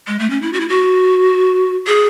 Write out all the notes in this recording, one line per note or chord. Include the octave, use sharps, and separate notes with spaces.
G#3
A3
C#4
E4
F#4
E4
F#4
G#4